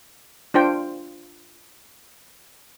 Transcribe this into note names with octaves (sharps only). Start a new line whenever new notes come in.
D4 F4 C5 G5